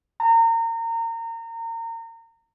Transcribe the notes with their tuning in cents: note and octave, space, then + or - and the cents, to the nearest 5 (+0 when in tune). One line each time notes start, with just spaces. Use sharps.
A#5 -30